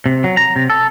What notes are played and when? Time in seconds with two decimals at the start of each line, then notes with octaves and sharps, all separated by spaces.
0.06 C3
0.24 F#3
0.37 A#5
0.56 C3
0.70 A4